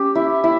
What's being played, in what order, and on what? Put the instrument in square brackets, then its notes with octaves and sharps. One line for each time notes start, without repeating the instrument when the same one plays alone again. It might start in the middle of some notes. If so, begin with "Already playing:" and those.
Already playing: [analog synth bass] C#4 [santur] G4
[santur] E4
E4